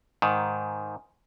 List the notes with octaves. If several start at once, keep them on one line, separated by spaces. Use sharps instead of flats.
G#2 D#3